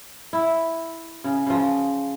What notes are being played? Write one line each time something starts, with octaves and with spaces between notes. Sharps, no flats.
E4
C#3
C#3 F3